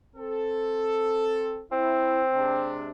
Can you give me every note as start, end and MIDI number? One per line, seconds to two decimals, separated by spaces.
0.16 1.64 60
0.16 1.64 69
1.72 2.81 60
1.72 2.22 64
2.34 2.91 48
2.34 2.91 56
2.34 2.91 62